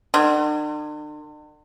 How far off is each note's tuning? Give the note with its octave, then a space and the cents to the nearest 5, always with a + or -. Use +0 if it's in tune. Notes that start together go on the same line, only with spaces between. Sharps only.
D3 +45